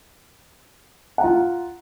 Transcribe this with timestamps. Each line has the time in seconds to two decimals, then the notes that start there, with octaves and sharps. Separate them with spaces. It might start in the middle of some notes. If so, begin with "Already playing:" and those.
1.18 F#5
1.21 A#5
1.24 F4